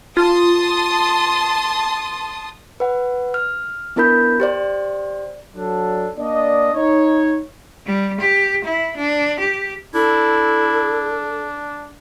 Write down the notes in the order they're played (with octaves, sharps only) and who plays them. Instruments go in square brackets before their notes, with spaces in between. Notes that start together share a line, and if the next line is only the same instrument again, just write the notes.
[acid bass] F4 [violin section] A5 C6 D#6
[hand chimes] B4 F#5
F6
B3 D4 E4 A#4 B5 G6
G4 C5 D5
[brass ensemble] F#3 D4 A4
A#3 D4 D5 D#5
D#4 C#5
[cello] G3
G4
E4
D4
G4
[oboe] D4 [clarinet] E4 [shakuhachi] A4